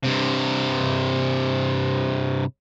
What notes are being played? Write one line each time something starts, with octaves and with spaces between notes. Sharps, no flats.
G2 C3